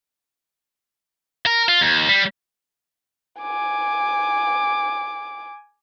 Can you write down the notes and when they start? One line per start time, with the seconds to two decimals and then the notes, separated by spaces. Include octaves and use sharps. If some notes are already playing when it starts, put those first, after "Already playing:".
1.46 A#4
1.69 F4
1.81 D#2
2.09 G3
3.41 G#5 D6